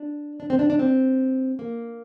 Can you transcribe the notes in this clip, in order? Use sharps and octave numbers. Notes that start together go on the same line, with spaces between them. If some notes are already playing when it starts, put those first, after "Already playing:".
Already playing: D4
D4
C4
D4
D4
C4
A#3